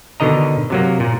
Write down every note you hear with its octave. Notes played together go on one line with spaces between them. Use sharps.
B2 D3 D#3 D#5 A#5
C3 F#3 A#3
A#2